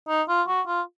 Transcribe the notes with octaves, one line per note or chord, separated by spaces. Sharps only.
D#4
F4
F#4
F4